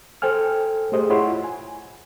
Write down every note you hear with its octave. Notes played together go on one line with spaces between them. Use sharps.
A4 C5 G5 G#5 F6
A3 G4 G#4 C5 D#5
E4 F4 C#5 F#5 B5 C6
G#5